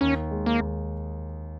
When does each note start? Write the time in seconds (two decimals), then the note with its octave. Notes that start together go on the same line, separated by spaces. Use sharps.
0.01 D#2 C#4
0.31 G#3
0.46 A#3
0.61 D#2